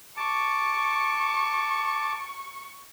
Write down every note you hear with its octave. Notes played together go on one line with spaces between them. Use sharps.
A5 C#6 D6